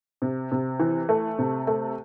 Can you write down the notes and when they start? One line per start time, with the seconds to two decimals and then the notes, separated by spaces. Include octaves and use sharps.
0.22 C3
0.52 C3
0.80 E3
1.09 A3
1.39 C3
1.67 A3